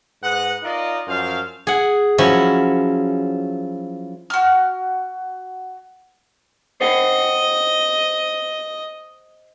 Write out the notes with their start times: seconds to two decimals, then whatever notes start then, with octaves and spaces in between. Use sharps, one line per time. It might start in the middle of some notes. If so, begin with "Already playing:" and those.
0.22 G#2 B4 D#5 F#5
0.63 D#4 F4 A#4 D5 D#5
1.08 F#2 F3 C5 F5
1.67 G#4 F#5
2.18 F3 F#3 C#4 E4
4.30 F#4 F6
6.81 C5 D#5 F#5 G5